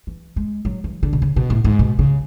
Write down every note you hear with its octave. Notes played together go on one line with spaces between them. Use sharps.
E3
G#3
F#3
E3
D3
B2
C#3
B2
A2
G#2
B2
C#3